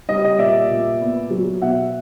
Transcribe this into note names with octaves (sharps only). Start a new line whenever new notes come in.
G3 D#5
D#5
A#2 D5 E5
A#2
B3
F#3
B2 E5 F#5